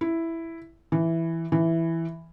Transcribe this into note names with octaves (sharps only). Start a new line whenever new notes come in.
E4
E3
E3